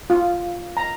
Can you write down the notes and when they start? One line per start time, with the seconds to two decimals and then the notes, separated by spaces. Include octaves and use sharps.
0.10 F4
0.77 A#5